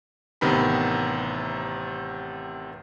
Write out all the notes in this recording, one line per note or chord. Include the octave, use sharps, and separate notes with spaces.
A1 C3 D#3 B3 A#5 B5